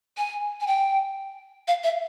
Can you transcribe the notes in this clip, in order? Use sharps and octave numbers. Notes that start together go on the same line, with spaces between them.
G#5
G#5
G5
F5
E5